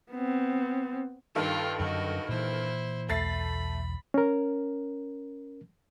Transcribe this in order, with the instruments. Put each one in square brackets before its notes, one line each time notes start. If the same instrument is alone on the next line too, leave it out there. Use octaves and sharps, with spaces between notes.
[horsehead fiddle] B3 C4
[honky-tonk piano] G2 D#3 A4 [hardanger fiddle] F4 G4
[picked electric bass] F#2 D3 [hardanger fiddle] F#4 D#5
[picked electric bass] A#2 E3 [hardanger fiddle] E4 C5
[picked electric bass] B1 E2 [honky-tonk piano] A3 A6 C7 [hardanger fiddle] B5
[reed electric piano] C#4 A#4